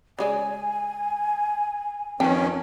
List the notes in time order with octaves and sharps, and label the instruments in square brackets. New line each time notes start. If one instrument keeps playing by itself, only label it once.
[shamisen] C#3 G#3 D5 [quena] G#5
[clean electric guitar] F2 C4 A5 [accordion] D#3 C#4 [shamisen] B4 G5